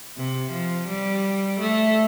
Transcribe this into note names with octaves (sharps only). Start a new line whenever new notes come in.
C3
F3
G3
A3